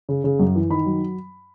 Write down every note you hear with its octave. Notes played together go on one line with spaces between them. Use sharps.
C#3
C#3
F#2
E3
D#3 B5
F#3